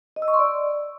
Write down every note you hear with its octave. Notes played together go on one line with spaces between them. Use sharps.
D#5
E6
C#6
C6
D5